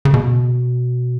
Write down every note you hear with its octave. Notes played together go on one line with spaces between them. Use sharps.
C#3
B2